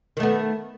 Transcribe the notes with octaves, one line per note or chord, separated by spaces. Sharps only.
D#3 A3 B3